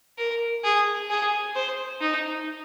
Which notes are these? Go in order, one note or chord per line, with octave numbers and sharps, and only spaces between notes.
A#4
G#4
G#4
C5
D#4